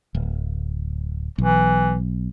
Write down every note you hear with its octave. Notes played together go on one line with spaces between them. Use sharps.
D1
B1 E3